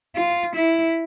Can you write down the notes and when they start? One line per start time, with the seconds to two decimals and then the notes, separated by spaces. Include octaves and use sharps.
0.16 F4
0.56 E4